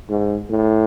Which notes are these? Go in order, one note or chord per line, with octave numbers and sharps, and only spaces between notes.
G#2
A2